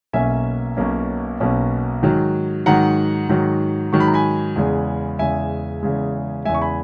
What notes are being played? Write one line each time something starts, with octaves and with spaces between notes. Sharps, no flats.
B1 B2 A#3 C#4 E5 G#5
B1 B2 A#3 C#4
B1 B2 A#3 C#4
G#2 D#3 F#3
G#2 D#3 F#3 F#5 A#5
G#2 D#3 F#3
G#2 D#3 F#3 C#6
B5
A#5
G#5 B5
E2 C#3 G#3
E2 C#3 G#3 E5 G#5
E2 C#3 G#3
E2 C#3 G#3 E5 G#5
C#6
G#5 B5